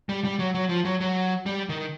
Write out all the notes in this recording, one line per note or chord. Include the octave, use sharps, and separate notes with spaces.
G3
G3
F#3
F#3
F3
F#3
F#3
G3
D#3